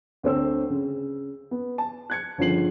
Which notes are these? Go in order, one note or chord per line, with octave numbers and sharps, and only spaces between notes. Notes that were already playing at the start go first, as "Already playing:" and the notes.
D2 C4 C5 E6
C#3
B3
A5
F#6 G#6 C#7
G1 C#3 F3 F4 C7 F#7